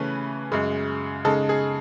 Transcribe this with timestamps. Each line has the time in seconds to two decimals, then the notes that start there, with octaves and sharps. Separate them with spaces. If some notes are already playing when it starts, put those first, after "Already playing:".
Already playing: C#3 E3 A3 C#4 B4
0.52 F#2 C#3 G#3
1.25 C#3 G#3 D#4 A4
1.49 G#4